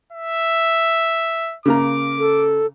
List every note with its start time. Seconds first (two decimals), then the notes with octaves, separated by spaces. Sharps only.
0.12 E5
1.66 C#3 A#3 A#5 D6
2.19 A4